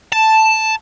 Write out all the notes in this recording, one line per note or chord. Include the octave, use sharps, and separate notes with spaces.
A5